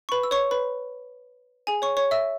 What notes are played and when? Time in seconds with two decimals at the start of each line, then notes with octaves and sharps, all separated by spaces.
0.09 C#6
0.12 B4 B5
0.23 E6
0.31 C#5 C#6
0.51 B4 B5
1.67 G#4 G#5
1.82 C#5 C#6
1.97 C#5 C#6
2.11 E5 E6